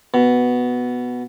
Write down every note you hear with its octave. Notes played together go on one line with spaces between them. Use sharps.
B2